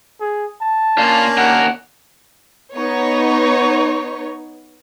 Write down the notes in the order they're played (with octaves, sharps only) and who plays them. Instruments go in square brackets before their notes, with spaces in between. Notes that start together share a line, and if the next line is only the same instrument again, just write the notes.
[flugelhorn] G#4
A5
[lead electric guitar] A#2 F4 [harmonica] A#3 C#4 D4
[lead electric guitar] D#2 A#4 [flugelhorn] F#5
[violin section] B3 D#4 C#5